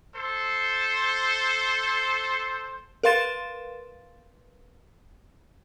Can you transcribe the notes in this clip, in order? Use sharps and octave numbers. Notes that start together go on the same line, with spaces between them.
A4 C5
A#4 B4 F5 C6 A6 E7